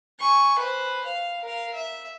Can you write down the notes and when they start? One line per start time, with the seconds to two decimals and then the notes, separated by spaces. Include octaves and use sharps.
0.20 G#5 C#6
0.59 B4 C5
1.05 F5
1.43 A#4 F5
1.74 E5